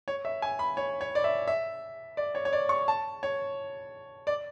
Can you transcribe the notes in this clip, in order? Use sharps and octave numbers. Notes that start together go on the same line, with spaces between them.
C#5
E5
G#5
B5
C#5
C#5
D5
E5
E5
D5
C#5
C#5
D5
C#6
A5
C#5
D5